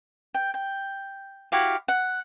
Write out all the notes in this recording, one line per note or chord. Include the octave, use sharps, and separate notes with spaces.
G5
G5
E4 F#4 G4 F5
F#5